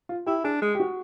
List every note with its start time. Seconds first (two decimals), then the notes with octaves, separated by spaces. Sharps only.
0.09 F4
0.26 E4 G4
0.44 D4 G#4
0.62 G#3
0.75 G4
0.80 F#4